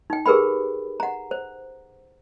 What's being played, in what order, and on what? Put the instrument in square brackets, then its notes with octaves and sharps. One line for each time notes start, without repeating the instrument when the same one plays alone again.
[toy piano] D#4 G5
G4 G#4 A#4 B4 G5 B5
F#5 A#5
C5